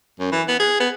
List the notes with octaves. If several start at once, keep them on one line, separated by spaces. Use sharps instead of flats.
F#2
E3
B3
G#4
B3